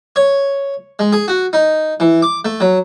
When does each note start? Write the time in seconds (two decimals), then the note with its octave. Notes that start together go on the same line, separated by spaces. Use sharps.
0.16 C#5
0.99 G#3
1.13 G#4
1.28 F#4
1.53 D#4
2.00 E3
2.22 D6
2.45 A3
2.60 F#3